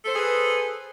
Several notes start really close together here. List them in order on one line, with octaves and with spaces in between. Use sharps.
A4 C5 G#4 B4